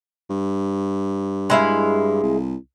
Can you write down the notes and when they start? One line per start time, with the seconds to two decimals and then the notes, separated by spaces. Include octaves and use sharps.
0.30 G2
1.50 G#3 E4 F5
2.23 C2